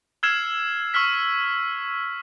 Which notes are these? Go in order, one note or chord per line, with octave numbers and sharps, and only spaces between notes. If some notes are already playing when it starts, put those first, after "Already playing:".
E6 F6 G#6 C7 E7
C#6 E6 F6 B6